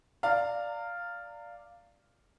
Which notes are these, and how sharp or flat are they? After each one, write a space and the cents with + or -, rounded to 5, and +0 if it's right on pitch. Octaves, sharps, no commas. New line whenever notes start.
D5 +0 F5 +0 A#5 -30